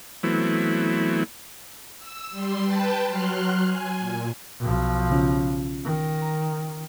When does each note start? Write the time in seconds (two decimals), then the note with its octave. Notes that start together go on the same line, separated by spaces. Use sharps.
0.23 E3 F#3 A3 B3 C4 E4
1.99 E6
2.31 G3 C6
2.63 B4 G5 A5
3.08 F#3 C6 F6 F#6
3.64 G#5
4.00 A#2
4.60 B1 F3
5.11 C#3 C#4 F4
5.85 D#3
6.22 A#5